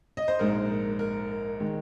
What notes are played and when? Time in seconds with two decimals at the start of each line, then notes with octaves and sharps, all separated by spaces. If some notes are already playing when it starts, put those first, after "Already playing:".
0.17 D#5
0.28 C5
0.39 A#1 G#2 G#3 A#4
0.99 A#4
1.60 D#3 G#3